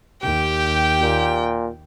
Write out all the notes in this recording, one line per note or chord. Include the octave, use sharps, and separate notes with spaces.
D#2 G4 G5
A#2